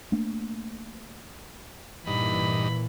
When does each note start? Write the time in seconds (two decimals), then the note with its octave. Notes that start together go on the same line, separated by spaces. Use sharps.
0.12 A3 A#3 D4
2.07 G2 A#2 E3 D#4 B5